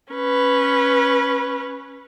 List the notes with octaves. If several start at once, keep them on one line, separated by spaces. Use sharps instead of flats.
C#4 B4